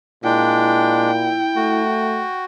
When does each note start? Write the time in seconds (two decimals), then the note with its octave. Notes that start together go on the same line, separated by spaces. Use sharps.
0.24 A#2 G#3 D4 E4 G5
1.56 A3 F#4